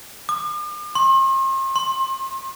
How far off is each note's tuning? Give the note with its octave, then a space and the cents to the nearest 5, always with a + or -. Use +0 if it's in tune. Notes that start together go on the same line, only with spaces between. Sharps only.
D6 +45
C6 +40
C6 +25